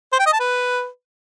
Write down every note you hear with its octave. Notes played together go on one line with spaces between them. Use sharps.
C5
G5
D#5
A5
B4